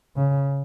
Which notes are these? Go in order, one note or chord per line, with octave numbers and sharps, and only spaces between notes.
C#3